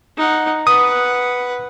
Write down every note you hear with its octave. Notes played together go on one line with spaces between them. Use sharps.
D#4 F#5
B4 F#5 D#6